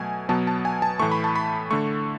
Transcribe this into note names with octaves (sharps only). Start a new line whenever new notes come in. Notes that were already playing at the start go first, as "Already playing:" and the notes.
Already playing: B2 F#3 A3 G#5
B2 F#3 B3 A5
A5
G#5
A5
A2 E3 A3 C#6
B5
A5
B5
D3 A3 C#6